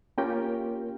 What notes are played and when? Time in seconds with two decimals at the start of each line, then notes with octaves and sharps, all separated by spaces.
0.18 A#3 C#4 F4 G4 A#4 G5